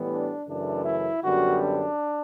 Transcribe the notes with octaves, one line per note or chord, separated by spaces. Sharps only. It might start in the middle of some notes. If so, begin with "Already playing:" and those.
Already playing: A2 E3 G3 B3
D4
F#2 C#3 E3 A3 D4
E4
F#2 D3 G3 B3 F#4
D4